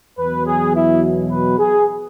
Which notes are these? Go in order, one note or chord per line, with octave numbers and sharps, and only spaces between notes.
E2 B2 F#3 B4
G#4
E4
B4
G#4